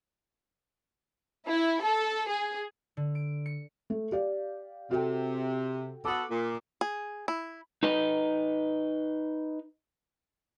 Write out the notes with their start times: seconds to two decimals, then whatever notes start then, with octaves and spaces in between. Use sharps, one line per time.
1.47 E4
1.82 A4
2.28 G#4
2.97 D3
3.15 D7
3.46 C#7
3.90 A3
4.12 G4 D5 F5
4.91 C3 F#4 A4 G5
6.05 B3 F#4 A4 D6 D#6
6.30 A#2
6.81 G#4
7.28 E4
7.83 D#4 B4 D#5